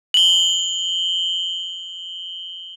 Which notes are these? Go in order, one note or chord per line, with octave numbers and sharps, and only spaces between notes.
F#7 G7